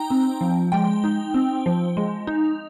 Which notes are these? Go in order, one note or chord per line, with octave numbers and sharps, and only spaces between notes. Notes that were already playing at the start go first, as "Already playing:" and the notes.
Already playing: D#4 G5 A#5
C4
F3
G#3 G5
D#4
C4
F3
G#3
D#4